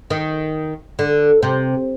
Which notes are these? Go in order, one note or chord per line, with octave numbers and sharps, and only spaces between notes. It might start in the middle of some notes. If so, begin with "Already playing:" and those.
D#3
D3
C3